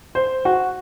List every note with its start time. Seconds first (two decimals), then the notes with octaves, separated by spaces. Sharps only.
0.15 C5
0.45 F#4